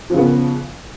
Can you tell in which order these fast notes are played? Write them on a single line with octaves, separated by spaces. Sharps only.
F3 C#3 B3